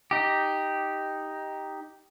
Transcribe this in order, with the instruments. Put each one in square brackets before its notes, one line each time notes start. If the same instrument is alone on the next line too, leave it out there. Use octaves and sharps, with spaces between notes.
[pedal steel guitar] D#4 G4